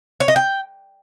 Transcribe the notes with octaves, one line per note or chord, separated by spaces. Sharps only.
C#5
D#5
G5